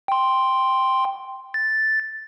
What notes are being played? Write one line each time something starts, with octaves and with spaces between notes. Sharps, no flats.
G5 C6
A6